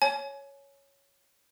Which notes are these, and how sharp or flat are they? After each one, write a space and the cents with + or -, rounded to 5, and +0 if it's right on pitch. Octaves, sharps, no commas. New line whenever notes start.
C#5 +0 G#5 +25